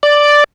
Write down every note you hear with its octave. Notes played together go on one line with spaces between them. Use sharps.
D5